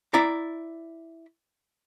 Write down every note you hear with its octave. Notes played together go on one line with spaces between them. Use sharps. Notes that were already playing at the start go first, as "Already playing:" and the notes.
E4 D5 A#5